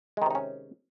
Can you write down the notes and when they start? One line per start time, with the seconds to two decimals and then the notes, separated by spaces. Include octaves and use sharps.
0.17 G#3
0.22 D#3
0.26 C3
0.31 D#4
0.35 C#4